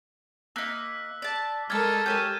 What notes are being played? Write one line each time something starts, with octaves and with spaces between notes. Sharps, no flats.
A#3 D#4 E6 F#6 B6
D5 A5
G#3 A4 A#4 D5 C#6 F6 G#6 A6
G4 C#5 G#5 G6 D#7 E7